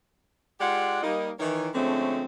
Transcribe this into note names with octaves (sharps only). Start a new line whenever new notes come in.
G#3 F4 G4 D5 F#5
G3 A#3 D#4
D#3 E3 C#5
D3 F3 G#3 A3 C4 C#4